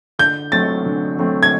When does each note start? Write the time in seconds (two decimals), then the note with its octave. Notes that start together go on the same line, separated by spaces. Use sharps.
0.19 D3 G6
0.52 F#3 A3 C4 A6
0.86 D3
1.19 F#3 A3 C4
1.43 G#6